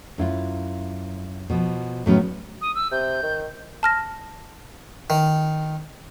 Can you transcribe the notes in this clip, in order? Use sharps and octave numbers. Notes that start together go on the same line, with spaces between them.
F#2 E4 F4
B2 F3
A2 D#3 F#3 G#3 B3 C#4
D#6
E6
C3 G6
D#3
A5 F6 A#6
D#3